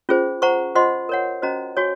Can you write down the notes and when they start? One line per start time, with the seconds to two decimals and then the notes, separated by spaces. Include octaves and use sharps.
0.09 C#4 F4 G#4 C5
0.42 C5 F#5 A#5 C#6
0.75 F4 C5 D#5 F#5 C6
1.09 A#4 C#5 F#5
1.42 C#4 F#4 C5 D#5 A#5
1.77 F#4 C#5 G#5 C#6